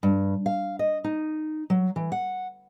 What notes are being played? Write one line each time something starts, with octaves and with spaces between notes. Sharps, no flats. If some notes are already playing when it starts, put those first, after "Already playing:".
G2
F5
D#5
D#4
F#3
E3
F#5